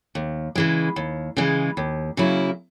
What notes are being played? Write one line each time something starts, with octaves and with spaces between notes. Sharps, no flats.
D#2
C#3 E3 G#3
D#2
C#3 E3 G#3
D#2
C#3 F#3 A#3 E4